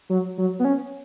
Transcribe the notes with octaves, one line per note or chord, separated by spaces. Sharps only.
F#3
F#3
B3
C#4